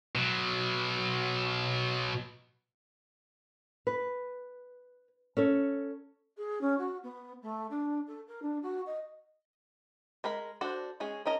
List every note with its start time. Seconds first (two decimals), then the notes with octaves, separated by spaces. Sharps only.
0.15 B2 F#3
3.87 B4
5.37 C#4 A4 C#5
6.36 G#4
6.61 C#4
6.78 F#4
7.03 B3
7.42 A3
7.70 D4
8.07 A4
8.27 A#4
8.42 D4
8.62 F#4
8.86 D#5
10.24 G#3 A#4 B5
10.61 D4 F#4 A4 C5
11.00 G#3 C#4 G#4
11.26 C#4 A#4 D#5 A#5